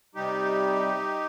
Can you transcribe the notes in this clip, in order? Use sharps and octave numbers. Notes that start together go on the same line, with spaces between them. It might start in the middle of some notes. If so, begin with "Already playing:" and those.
C3 G3 D#4 G4